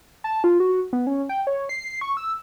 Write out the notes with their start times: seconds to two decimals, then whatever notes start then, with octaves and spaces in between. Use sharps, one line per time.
0.24 A5
0.44 F4
0.60 F#4
0.93 B3
1.07 C#4
1.29 G5
1.47 C#5
1.69 C7
2.01 C#6
2.17 E6